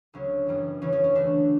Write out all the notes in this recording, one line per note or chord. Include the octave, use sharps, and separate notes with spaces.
D2 C#3 F#3 C#4
F#2 E3 G3 B3
E2 C#3 E3 G3 C#4
C#4
C#4
D2 D3 A3 D4